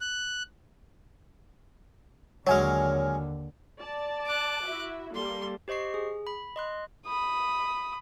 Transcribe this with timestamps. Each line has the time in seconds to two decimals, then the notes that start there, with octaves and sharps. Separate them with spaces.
0.01 F#6
2.47 D#2 D3 F#3 G#3 C#5 G#5 F6
3.80 D5 A5
4.26 D6 F#6
4.66 E4 F#4 E5
5.15 G3 A#3 A4 C6
5.68 G4 C5 D#5 C#6 C7
5.94 G#4
6.27 B5
6.56 D#5 C6 F#6
7.06 B5 D#6